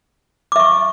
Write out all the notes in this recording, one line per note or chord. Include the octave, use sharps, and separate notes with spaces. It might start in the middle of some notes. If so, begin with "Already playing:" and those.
E5 C#6 D6